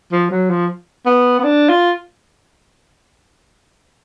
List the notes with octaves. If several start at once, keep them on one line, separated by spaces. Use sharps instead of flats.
F3
F#3
F3
B3
B3
D4
F4